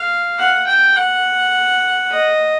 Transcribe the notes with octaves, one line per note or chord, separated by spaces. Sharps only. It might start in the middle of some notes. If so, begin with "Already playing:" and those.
Already playing: F5
F#5
G5
F#5
D#5